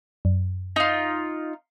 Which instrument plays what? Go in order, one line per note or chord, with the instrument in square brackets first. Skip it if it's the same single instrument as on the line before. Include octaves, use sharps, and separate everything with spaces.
[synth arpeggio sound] F#2
[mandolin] D#4 F4